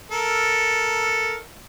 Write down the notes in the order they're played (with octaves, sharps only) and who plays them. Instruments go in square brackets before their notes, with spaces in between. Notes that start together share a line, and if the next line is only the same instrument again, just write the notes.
[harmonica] A4 A#4